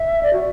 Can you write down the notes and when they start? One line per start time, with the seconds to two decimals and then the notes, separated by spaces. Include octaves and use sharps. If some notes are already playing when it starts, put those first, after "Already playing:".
Already playing: E5
0.23 D5
0.33 F#4